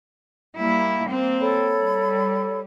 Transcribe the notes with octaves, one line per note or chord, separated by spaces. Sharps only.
G3 A#3 E4
A#3 C4
A4 C#5 B5
G3